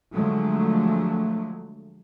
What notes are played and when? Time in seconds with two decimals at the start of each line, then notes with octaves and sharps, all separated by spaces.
0.13 D3 F3 F#3 G#3 A3